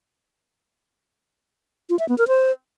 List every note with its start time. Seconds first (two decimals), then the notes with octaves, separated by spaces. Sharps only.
1.90 F4
1.99 E5
2.09 B3
2.18 A#4
2.28 C5